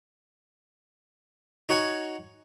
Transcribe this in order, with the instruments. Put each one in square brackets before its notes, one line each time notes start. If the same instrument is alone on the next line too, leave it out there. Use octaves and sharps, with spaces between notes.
[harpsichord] D#4 F#4 C#5 F#5 G#5